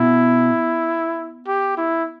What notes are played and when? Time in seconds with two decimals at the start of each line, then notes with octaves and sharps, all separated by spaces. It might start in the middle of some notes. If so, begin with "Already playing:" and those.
Already playing: B2 E4
1.47 G4
1.77 E4